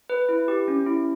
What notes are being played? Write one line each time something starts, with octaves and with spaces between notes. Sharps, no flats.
B4
E4
G4
C#4
E4